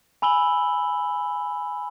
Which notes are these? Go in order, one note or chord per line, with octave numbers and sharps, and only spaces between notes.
G#5 B5 E6 F#7 G7